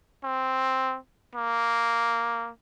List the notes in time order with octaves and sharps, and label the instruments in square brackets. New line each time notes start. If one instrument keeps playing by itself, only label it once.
[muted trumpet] C4
A#3